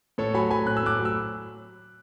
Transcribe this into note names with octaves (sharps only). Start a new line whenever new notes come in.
A2 A4 C#5
F#3 G#5 B5
F#3 G#5 B5
A2 F#6
E6
A2 D6 F#6
F#3
E6